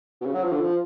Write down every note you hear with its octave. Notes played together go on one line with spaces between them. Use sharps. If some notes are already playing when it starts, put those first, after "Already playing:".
B2
C#3
F#3
F3
D3
F3